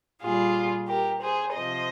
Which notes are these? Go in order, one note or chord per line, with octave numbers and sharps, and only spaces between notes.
A#2 G3 F4 G#4
G4 A#4
G#4 C5
C3 F3 C5 D#5